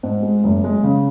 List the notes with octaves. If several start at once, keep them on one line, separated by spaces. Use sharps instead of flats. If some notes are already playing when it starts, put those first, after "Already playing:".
G#2
G#3
F#1
G#3
C#3